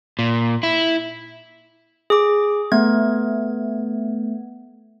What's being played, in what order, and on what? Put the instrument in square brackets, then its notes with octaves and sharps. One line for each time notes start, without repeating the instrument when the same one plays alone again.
[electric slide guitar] A#2
E4
[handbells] G#4 D6
A3 B3 G#6